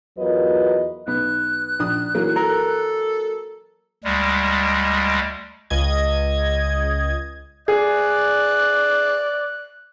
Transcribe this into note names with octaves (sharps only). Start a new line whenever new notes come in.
E2 F#3 F4 A#4 B4 D#5
B1 B3 F#6
A#1 D4 D#6
E3 F#3 A#3
A4 A#4
D2 G3 G#3
C#2 D#5 G#6
G#4 D5 F#6